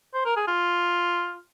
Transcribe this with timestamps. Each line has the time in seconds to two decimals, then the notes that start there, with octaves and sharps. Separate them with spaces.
0.14 C5
0.26 A#4
0.37 G#4
0.48 F4